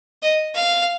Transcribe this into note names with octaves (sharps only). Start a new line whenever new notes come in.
D#5
F5